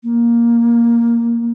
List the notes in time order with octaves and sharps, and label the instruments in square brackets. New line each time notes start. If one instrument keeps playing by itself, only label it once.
[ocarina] A#3